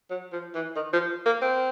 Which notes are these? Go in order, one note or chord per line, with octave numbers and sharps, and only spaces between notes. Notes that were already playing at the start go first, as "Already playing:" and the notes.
F#3
F3
E3
D#3
F3
A#3
C4